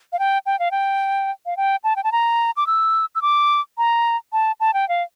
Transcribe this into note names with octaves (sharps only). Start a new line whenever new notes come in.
F5
G5
G5
F5
G5
F5
G5
A5
G5
A5
A#5
D6
E6
E6
D6
A#5
A5
A5
G5
F5